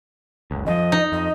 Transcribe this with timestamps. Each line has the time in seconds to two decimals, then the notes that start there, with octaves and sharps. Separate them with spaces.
0.51 F#1 C#2
0.66 F2 E3 F3 D#5
0.92 D#4
1.12 F2 D#5